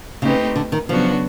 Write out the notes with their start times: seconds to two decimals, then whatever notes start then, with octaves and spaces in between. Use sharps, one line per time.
0.22 C#3 A3 C4 D#4 G4 B4
0.56 D3
0.72 D#3
0.89 C#3 F3 F#3 B3 D4 F#4